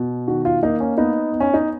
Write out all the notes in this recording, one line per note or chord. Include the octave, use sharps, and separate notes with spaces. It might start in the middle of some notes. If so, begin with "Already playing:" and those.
Already playing: B2
D#3 F#4
F4
A#3 D#4
C#4
B3 D#4
B3
C#4
D#4